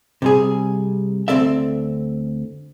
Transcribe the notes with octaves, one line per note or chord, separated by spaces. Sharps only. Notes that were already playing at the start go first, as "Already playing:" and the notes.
C3 G3 G#4
D2 G#2 C4 A4 D5 E5